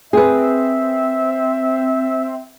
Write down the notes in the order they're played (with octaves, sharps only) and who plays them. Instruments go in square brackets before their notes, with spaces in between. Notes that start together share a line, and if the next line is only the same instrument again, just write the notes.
[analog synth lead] C4 [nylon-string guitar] G#4 B4 [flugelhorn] E5